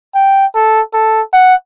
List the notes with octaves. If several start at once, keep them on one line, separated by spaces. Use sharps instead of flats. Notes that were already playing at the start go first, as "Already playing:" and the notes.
G5
A4
A4
F#5